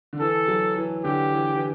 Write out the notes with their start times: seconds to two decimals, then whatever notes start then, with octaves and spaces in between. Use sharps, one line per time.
0.13 D3
0.20 E3 A4
0.48 F#3
0.76 E3
1.04 D3 G4
1.33 E3
1.53 E3